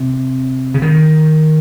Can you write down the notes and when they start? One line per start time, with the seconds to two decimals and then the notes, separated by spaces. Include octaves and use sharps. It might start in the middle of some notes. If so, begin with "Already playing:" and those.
Already playing: C3
0.74 C#3
0.82 D#3